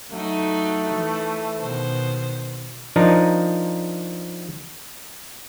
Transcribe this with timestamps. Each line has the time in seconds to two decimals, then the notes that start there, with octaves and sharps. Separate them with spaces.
0.12 F#3 A3 D#4
0.95 E3
1.59 B2 D#3 C5
2.96 F3 D4 D#4 A#4